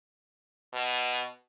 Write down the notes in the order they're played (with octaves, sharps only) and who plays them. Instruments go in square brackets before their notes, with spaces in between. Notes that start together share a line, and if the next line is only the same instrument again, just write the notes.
[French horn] B2